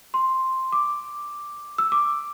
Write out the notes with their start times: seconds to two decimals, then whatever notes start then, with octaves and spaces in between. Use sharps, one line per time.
0.14 C6
0.72 D6
1.78 E6
1.92 D6